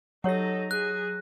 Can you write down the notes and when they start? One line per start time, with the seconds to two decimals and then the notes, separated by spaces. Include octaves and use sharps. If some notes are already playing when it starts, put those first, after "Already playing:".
0.24 F#3 D#4 G4 A4 C#5 F#5 A#6
0.71 G#4 F#6